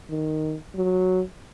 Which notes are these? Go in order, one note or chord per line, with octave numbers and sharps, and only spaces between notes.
D#3
F#3